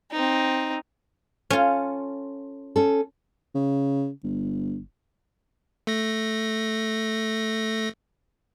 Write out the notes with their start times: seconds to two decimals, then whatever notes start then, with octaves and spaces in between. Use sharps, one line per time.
0.11 C4 D#4
1.50 C#4 F4 A4
2.76 C#4 A4
3.55 C#3
4.24 G1
5.87 A3 A#6